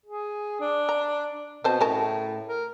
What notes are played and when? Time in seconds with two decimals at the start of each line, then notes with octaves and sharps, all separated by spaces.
0.06 G#4
0.60 D4
0.89 A#5
1.64 B2 C4 C5 A5
1.81 A2 C#3 A#4 A5
2.48 A#4